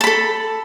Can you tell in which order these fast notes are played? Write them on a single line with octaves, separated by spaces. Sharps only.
A5 B5 A4